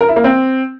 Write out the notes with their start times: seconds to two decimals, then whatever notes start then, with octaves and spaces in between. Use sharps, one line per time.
0.01 A#4
0.08 E4
0.16 A#3
0.24 C4